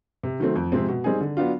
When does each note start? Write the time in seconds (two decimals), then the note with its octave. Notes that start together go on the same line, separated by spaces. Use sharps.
0.23 C3
0.40 D#3 F#3 A3 C4
0.56 F2
0.72 C3 F3 G#3 C4
0.88 B2
1.04 G3 C4 D#4 G#4
1.21 D3
1.37 F#3 B3 D4 F4